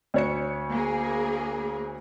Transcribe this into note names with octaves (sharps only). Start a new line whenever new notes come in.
D2 C#5 C#7
A#3 G#4